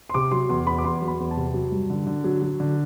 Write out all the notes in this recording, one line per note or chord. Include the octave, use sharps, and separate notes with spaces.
C6
C3 D6
F#3 C6
E2 C6
E2 B5
D6
E2 C6
F#3
B5
E2
A5
C3
F#3
G2
D3
D3
F#3
F#3
D3